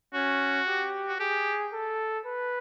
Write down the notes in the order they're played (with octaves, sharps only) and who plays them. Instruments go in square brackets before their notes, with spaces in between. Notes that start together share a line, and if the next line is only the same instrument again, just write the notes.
[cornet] C#4 [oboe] F#4
[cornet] G4
[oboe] F#4
[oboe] G4 [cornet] G#4
[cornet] A4
B4